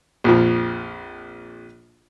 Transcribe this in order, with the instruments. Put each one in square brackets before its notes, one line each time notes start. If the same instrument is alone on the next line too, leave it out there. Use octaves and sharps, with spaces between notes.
[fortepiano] A#1 F2 F3